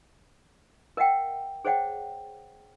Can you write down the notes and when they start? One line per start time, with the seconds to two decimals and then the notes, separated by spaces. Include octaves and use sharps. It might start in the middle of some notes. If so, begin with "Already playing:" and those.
0.97 A#4 D#5 E5 F#5 G5
1.65 G#4 C5 C#5 D#5 F#5 G5